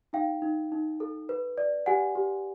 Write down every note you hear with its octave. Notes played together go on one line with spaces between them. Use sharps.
D#4 F5 G5
D#4
D#4
A4
B4
D5
G4 F#5 G#5
G4